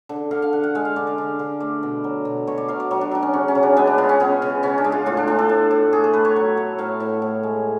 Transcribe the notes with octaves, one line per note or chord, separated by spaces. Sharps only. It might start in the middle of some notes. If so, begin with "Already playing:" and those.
D3
D3 F5
F5
D3 F#5
F#5
G#3 F5
F5
D3 D5
D5
D3
D3
A3 D5
B2
F#3
B2
B2 C#5
D5
F#3 F5
D5
F#3 C#5
D4
F#3 D4
C#4
C#3 C#4
C#4
C#3
D4
G#3 B3
D4
C#3 F4
C#4
C#3 B3
C#3
C#3 C#4
D4
G#3
F4
A2 F4
D4
A2 D4
A4
A2
A2
A3 G#4
A4
A3 B4
C#5
F#3
A3
A2 F5
A2
A2
G#3